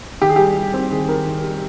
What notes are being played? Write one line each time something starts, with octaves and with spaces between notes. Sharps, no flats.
D#3 G4
G#4
G3 G4
G3
C4
D#3 G#4
D#3 A#4
D#3
G3